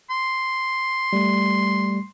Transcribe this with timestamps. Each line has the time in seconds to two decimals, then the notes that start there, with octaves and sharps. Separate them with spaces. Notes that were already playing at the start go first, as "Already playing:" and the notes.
0.10 C6
1.13 G3 A3